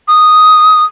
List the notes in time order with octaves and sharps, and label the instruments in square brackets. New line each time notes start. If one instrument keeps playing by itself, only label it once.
[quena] D#6